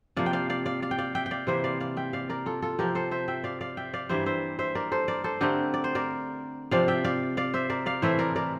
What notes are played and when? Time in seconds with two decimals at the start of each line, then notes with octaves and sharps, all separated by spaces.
0.16 C3 F3 A#3 D5 F5
0.26 G5
0.33 D5 F5
0.49 D5 F5
0.66 D5 F5
0.82 D5 F5
0.91 G5
0.98 D5 F5
1.15 E5 G5
1.26 G5
1.31 D5 F5
1.47 C3 E3 A#3 C5 E5
1.64 D5 F5
1.80 D5 F5
1.97 E5 G5
2.13 D5 F5
2.29 A#4 D5
2.46 F4 A4
2.62 F4 A4
2.79 C3 F3 C4 G4 A#4
2.95 A4 C5
3.11 C5 E5
3.28 E5 G5
3.44 D5 F5
3.61 D5 F5
3.77 E5 G5
3.93 D5 F5
4.09 G2 E3 G3 A#3 C5 E5
4.26 C5 E5
4.59 C5 E5
4.75 A#4 D5
4.92 A4 C5
5.08 A#4 D5
5.24 A4 C5
5.41 D3 A3 C4 G4 A#4
5.74 D5
5.84 C5
5.95 A#4 D5
6.71 C3 F3 C4 D5 F5
6.88 E5 G5
7.04 D5 F5
7.37 D5 F5
7.54 C5 E5
7.70 A#4 D5
7.86 D5 F5
8.02 A2 E3 A3 C4 C5 E5
8.19 A#4 D5
8.36 A#4 D5